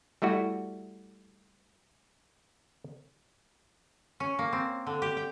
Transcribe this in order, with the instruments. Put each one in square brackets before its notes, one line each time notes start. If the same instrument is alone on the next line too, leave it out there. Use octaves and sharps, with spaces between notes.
[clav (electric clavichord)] G3 A3 E4 F#4
[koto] C#4
A#3
C4
D3
G4
G5